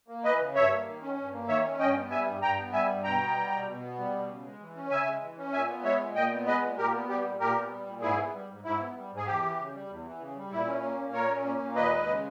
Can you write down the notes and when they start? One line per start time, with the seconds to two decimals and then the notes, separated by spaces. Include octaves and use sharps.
0.08 A#3
0.24 E3 B4 D#5
0.40 C#3
0.55 G2 C#5 E5
0.71 A#3
0.86 D#3
1.02 C#4
1.17 G2
1.33 A#3
1.48 D#3 C#5 E5
1.64 C#4
1.79 G2 D#5 G5
1.95 B3
2.11 G3 E5 G#5
2.26 G2
2.42 G2 G5 A#5
2.58 B3
2.73 G3 E5 G#5
2.89 G2
3.04 B2 G5 A#5
3.20 B3
3.35 G3
3.51 B2
3.66 B2
3.82 B3
3.98 G3
4.13 B2
4.29 C#3
4.44 G#3
4.60 E3
4.76 C#4
4.90 C#3 E5 G#5
5.06 G#3
5.22 E3
5.37 C#4
5.53 A#2 E5 G#5
5.68 B3
5.84 G#3 C#5 E5
6.00 A#2
6.15 A#2 D#5 G5
6.31 B3
6.46 G#3 B4 D#5
6.62 A#2
6.77 A#2 G4 A#4
6.94 B3
7.09 G3 G4
7.24 A#2
7.40 A#2 G4 A#4
7.55 B3
7.71 G3
7.87 A#2
8.02 G#2 E4 G#4
8.18 B3
8.33 G3
8.49 G#2
8.64 G#2 E4
8.80 B3
8.96 G3
9.11 G#2
9.17 G#4
9.26 E2 G4
9.42 E3
9.58 C#3
9.73 G3
9.89 E2
10.05 E3
10.20 C#3
10.35 G3
10.51 A#2 E4
10.67 C#4
10.82 A#3
10.98 A#2
11.13 A#2 A#4 C#5
11.29 C#4
11.45 A#3
11.60 A#2
11.75 D#2 B4 D#5
11.91 G#3
12.07 C#3